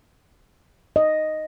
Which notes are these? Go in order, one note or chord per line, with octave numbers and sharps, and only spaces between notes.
D#5